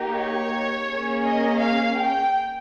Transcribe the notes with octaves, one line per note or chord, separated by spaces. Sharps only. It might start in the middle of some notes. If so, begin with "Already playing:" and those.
Already playing: A#3 D#4 G4
C#5
A#3 C#4 G#4
D#5
F5
G5